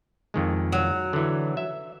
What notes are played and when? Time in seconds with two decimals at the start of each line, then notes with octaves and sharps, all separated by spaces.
0.34 F2 D#3 G#3
0.73 F#3
1.13 D3 E3
1.57 E5